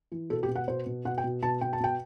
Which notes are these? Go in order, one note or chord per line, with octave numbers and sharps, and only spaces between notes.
E3
B2 A4
G4
B2
F#5
B2 C5
B2
B2 F#5
G5
B2
B2 A5
B2 G5
A5
B2 G5